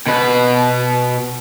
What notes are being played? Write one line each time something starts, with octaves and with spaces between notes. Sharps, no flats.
B2 B4